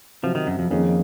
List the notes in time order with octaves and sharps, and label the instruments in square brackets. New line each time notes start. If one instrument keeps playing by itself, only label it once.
[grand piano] C3 F#3 C4 F4 [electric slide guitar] F3
[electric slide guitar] D#3
F#2
F2
[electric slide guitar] F2 [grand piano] D#3 A#3 C#4 G#4